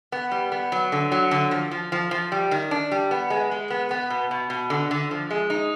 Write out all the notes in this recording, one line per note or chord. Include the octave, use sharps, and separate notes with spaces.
B3
G3
B3
F#3
D3
F#3
D3
F3
F3
F3
F3
G3
D#3
D4
G3
B3
G#3
G#3
B3
B3
B2
B2
B2
D3
D3
F3
G#3
D#4